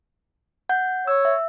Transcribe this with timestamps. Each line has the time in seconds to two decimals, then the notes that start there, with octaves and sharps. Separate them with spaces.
0.69 F#5 G6
1.07 C#5 E6
1.25 E5